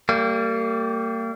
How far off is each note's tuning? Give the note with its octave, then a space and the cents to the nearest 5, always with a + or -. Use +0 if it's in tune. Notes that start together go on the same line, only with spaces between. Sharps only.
G3 -5 A#3 -35